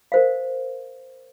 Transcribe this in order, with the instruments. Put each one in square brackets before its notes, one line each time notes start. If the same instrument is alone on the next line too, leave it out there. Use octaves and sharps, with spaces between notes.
[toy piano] A#4 C5 F5